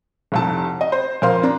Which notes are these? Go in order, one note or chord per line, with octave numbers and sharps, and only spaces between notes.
F1 C2 A5
D#5
C5
F2 A#4 C5 F5 C6
D4 A#5